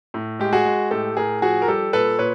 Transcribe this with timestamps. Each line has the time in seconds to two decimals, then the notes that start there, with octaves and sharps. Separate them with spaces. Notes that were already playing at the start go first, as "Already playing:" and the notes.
0.14 A2
0.39 G#3 G4
0.53 F#4 G#4
0.65 G#3
0.91 A2 G4 A4
1.17 A2 G#4 A#4
1.42 F3 F#4 G#4
1.62 A#4
1.68 G3 G4 A4
1.93 A#2 A4 B4
2.19 A#2 B4 C#5